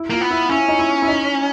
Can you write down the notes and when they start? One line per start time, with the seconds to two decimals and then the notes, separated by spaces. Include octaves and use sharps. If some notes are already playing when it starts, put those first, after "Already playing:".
Already playing: E4
0.10 A#3 F4
0.21 B3
0.31 E4
0.50 C#4 E4
0.68 D#4
0.79 E4
1.02 E4
1.08 D#4